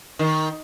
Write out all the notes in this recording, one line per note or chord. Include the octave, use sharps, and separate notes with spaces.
D#3